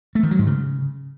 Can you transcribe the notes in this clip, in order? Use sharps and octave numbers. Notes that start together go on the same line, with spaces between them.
A3
D#3
F#3
G#2
C#3